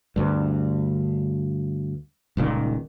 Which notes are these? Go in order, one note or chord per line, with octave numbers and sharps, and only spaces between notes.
D2 G2
D#1 C#2 A#2 D#3